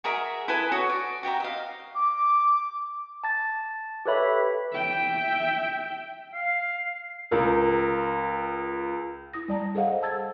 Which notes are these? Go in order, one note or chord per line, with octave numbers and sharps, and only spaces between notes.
F#4 G#4 A#4 E5
E4 A4 B4 G#5
F#4 C#5 D#6
D5
F#4 G4 E5 A#5
D#5 F5
D6
A5 A6
G4 A4 B4 C#5 E5 B5
E5 G5
F5 C7
C#2 A#4
E4 D#6 A#6
G3 D5 A5 A#5
G#4 A4 C5 D#5 F5 F#5
A5 E6 G#6 A6